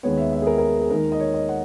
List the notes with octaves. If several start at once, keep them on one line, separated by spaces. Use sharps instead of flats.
D#2 D#3 G#3 B3 C#5
E5
E5
G#4
A#4
A#4
G#4
G#4
D#2 D#3 G#3 D#4 A#4
D#5
C#5
D#5
F#5